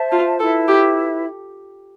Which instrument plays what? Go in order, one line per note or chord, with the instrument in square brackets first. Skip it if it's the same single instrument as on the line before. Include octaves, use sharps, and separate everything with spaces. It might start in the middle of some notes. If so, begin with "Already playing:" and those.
Already playing: [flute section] C5 E5 A5
[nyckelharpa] F4
[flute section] E4 B4 E5 [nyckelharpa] A4
[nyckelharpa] G4